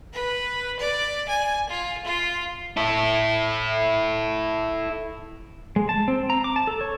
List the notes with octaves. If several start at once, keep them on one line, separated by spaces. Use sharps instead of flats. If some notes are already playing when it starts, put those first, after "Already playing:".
B4
D5
G#5
F4
F4
E4 A4
G#3
A5
C4
A#5
D6
A5
A4
C#5